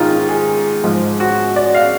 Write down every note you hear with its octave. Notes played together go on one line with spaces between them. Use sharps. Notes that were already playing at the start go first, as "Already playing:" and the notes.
Already playing: G#2 D#3 G#3 D#4 F4
G#4
G#2 F3 G#3
F#4
D5
F5